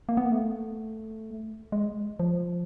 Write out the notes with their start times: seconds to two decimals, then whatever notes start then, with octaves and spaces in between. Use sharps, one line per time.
0.09 A#3
0.17 B3
0.25 A#3
0.32 A3
1.72 G#3
2.20 F3